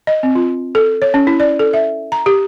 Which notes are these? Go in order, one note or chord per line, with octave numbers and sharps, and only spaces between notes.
D#5
C4
F4
A4
C#5
C#4
E4
D5
A4
E5
A#5
G4